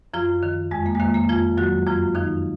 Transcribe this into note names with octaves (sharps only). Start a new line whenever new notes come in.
F#2 F3 F4
D#3
F2 G#3
A#3
G#3
D#3 A#3
A#3
F2 F3 F4
D#3 F#3 F#4
F#2 F3 F4
D#3 F3 D#4